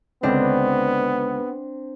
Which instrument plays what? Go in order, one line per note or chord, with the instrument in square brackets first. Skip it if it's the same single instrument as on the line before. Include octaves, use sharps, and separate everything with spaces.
[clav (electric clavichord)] C#2 D3 [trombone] B3 [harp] C4 D4